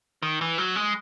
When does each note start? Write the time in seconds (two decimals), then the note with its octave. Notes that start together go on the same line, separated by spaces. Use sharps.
0.23 D#3
0.41 E3
0.58 F#3
0.76 G#3